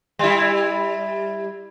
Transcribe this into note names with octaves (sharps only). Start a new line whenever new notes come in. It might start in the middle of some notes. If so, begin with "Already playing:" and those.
G3 E4